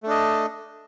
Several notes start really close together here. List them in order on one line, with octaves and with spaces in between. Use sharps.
A3 D4 D#5